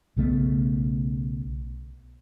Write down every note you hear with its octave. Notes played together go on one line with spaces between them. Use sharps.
B1 C#3 A3 B3